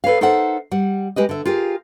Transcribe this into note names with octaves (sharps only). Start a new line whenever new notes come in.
A4 B4 C#5 F5
D#4 A4 A#4 C5 E5 F#5
G3 F#5
G#3 G4 B4 D#5
D3 E5
F4 G4 G#4 A#4